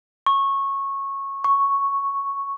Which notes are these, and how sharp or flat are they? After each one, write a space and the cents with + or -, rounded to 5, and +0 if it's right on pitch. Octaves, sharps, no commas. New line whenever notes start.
C#6 -15
C#6 +0